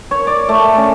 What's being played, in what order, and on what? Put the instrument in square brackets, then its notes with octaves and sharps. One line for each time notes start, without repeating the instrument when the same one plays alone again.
[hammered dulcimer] C#5
D5
A3
C#4